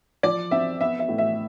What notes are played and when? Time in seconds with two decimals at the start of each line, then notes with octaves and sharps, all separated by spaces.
0.23 F3 D5
0.51 C4 E5
0.81 B3 E5
0.99 E5
1.09 A2
1.18 E5